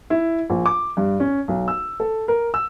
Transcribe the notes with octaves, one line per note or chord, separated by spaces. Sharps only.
E4
A#1
D6
G2
C#4
B1
E6
A4
A#4
E6